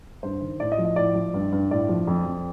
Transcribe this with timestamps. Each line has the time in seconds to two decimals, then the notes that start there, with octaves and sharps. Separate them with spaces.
0.23 G2 C5
0.41 D#3
0.60 A2 D5
0.72 D#5
0.78 F3
0.85 D#5
0.96 A2 D5
1.15 F3
1.34 G2
1.52 G2
1.71 A2 D5
1.89 F3
2.07 F2
2.26 F2